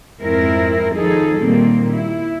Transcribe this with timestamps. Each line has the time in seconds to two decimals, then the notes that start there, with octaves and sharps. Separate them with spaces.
0.20 F2 G#2 G#3 C4 E4 A#4
0.95 D#3 F3 D#4 G#4 A4
1.39 A#2 D#3 G3 A#3 C4
1.92 E4